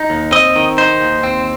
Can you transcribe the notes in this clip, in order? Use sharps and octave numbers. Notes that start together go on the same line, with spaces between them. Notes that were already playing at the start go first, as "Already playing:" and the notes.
Already playing: D#4
D#2
C4 D#5
D#3
D#4 C5
D#2
C4